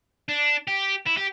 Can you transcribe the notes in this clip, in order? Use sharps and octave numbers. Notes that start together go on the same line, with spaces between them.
D4
G4
E4
G4